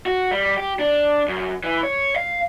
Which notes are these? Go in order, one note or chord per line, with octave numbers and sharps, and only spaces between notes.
F#4
G3
G4
D4
F#2
E3
C#5
F5